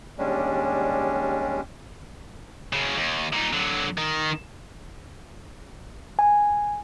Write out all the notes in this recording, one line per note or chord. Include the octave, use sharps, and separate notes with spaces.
D#2 G3 G#3 C#4 D4
F#2 C#3
D#2
A#2 D#4
D3 F#3
D#3
G#5